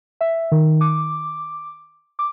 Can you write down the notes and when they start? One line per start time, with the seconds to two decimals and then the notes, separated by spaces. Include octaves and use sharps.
0.21 E5
0.52 D#3
0.81 D6
2.19 D6